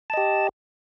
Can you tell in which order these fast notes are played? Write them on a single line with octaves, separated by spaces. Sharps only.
A5 D#5 G4